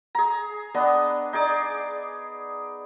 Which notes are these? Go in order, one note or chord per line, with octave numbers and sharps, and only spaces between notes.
G#4 A#5
B3 D4 D#5
D#4 G#4 D5